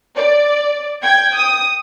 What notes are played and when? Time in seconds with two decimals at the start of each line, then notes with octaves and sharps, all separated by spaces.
0.16 D5
1.02 G5 G#6
1.37 D#6